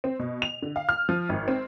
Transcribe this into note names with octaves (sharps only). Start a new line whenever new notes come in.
C4
B2
F7
D3
F5
F6
F3
G#1
C4